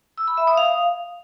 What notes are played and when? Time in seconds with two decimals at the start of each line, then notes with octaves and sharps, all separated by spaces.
0.18 E6
0.28 B5
0.37 E5
0.47 D#6
0.57 F5